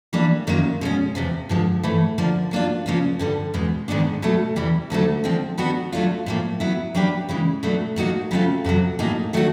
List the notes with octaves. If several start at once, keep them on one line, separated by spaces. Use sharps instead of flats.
E3 G3 A#3 D4
F#2 D#3 F#3 A#3
B2 G#3 C#4
E2 C3 F3
G2 D3 F3 G#3
G#2 E3 A3
D3 F3 A#3 D4
F#3 A#3 D4 F4
C#3 F3 A#3 C#4 F4
G2 D3 G3
E2 B2 G#3
G#2 D#3 G#3 B3 D4
B2 F#3 A3
E2 C3 E3 G3
D2 D3 F#3 A3
D3 F3 G#3 C4
D#3 G3 B3 D4 F#4
F#3 A3 D4 F4
A2 F3 A#3
F#3 B3 E4
F#3 A#3 D4 G4 B4
C#3 E3 G#3
B2 F#3 A3 D4
A2 F#3 A#3 D#4 F#4
C#3 F#3 A3 C4 F4
F2 C3 D#3 F#3
A2 F#3 A#3 D#4 G#4
D#3 F#3 A3 D4 F#4